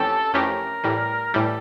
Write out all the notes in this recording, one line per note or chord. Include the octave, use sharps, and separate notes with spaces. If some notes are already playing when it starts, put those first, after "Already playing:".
Already playing: F2 E3 A3 C#4 G4 A4
F2 E3 A3 C#4 G4 A#4
A2 E3 G3
A2 E3 G3 A4